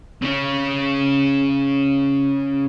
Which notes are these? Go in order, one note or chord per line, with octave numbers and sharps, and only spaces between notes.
C#3 C#4